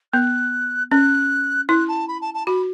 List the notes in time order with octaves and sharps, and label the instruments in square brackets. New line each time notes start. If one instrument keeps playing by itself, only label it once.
[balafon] B3 [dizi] F#6
[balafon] C#4 [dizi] F#6
[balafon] E4 [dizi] F#6
[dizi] A5
B5
A5
A5
[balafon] F#4 [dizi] B5